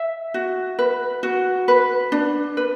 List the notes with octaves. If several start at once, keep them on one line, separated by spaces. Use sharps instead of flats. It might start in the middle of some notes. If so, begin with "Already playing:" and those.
Already playing: E5
F#4
B4
F#4
B4
D4
B4